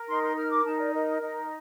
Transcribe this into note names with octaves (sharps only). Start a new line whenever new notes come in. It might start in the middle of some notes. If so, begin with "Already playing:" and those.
Already playing: A#4
D#4 C6
C6
A#4 F6
D6
D#4 A5
D5
A#4 D#5
D#4 D#5